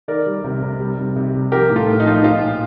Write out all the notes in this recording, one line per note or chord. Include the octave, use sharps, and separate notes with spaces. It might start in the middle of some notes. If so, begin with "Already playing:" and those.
D#3 A#4 D5
G3
C3
C3
G3
C3
C3
G3
F3 G4 A#4
A2
F4 A4
A2
D#4
F3 F4
D#4
F3 F4
A#2